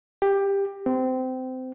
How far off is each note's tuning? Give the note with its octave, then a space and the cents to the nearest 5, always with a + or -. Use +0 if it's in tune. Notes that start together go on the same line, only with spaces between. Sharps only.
G4 +15
C4 -25